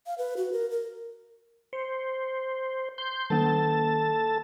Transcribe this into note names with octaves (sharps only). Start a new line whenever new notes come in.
F5
B4
F#4
A#4
A#4
C5 C#7
C6 G6
D#3 A#3 A4 A5